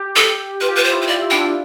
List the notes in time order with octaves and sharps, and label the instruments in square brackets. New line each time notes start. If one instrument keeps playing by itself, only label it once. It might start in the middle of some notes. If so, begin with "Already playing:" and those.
Already playing: [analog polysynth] G4
[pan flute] A4
[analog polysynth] F4 [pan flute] B4
[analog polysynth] G4
[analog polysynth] F4 [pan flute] B4
[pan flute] C5
[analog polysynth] E4
[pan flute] C5
D5
[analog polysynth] E4
[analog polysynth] D4 [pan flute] G5
[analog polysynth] E4